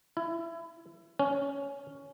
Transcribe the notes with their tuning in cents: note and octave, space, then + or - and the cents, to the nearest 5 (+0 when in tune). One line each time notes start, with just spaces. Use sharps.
E4 +25
C#4 +10